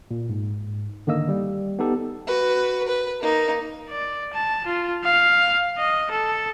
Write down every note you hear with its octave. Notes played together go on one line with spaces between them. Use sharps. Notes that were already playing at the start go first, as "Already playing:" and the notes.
A#2
G#2
D3 D#3 A#3 D#5 E6
G3
B3 D#4 G4 A4
F#4 B4
B4
A#3 D#4
D5
A5
F4
F5
D#5
A4